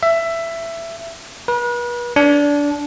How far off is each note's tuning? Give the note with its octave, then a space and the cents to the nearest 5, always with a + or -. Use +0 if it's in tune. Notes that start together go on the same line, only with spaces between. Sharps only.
E5 +15
B4 -40
D4 -20